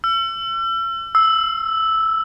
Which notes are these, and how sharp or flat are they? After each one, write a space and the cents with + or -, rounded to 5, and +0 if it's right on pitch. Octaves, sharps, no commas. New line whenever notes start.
E6 +40
E6 -5